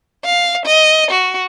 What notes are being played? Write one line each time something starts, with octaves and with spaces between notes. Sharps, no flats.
F5
D#5
F#4